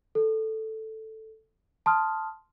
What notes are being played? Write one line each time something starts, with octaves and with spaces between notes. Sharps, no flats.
A4
A5 C6 D#6 F6